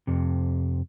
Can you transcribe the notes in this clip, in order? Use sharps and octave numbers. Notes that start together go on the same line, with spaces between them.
F2 C3